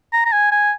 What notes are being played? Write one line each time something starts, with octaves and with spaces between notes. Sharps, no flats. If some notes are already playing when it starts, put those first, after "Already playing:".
A#5
A#5
G#5
G#5